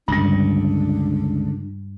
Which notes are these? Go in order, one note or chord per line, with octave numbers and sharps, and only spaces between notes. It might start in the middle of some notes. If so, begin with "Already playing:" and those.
C#2 G2 D3 G3 D4